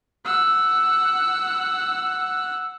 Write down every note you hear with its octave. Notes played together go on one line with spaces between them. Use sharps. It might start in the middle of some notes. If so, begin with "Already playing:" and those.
F#5 E6